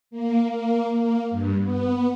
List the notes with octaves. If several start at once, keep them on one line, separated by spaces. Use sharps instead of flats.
A#3
A#3
A#3
G2
B3